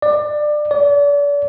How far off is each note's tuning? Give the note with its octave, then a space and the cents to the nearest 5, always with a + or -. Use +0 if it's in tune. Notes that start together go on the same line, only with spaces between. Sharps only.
D5 +20
D5 -40